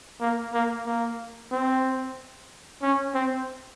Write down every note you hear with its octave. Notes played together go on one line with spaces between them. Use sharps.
A#3
A#3
A#3
C4
C#4
C4